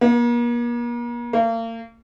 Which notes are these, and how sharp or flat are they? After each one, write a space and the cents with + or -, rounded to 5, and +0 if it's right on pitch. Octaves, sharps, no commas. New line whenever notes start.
A#3 +40
A#3 -40